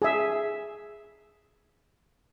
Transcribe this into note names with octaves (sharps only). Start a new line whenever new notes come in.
G#4 E5